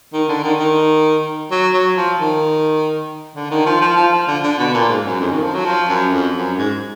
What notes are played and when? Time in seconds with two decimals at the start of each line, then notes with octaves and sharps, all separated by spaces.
0.13 D#3
0.29 D3
0.44 D#3
0.59 D#3
1.51 F#3
1.74 F#3
1.97 F3
2.20 D#3
3.36 D3
3.51 D#3
3.66 F3
3.81 F3
3.97 F3
4.12 F3
4.27 D3
4.43 D3
4.59 B2
4.74 A#2
4.89 G#2
5.05 F#2
5.20 F2
5.31 D#3
5.43 F3
5.54 F#3
5.66 F3
5.89 F#2
6.12 F2
6.35 F#2
6.58 G#2